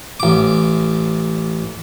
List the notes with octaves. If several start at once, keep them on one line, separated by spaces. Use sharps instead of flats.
A1 D6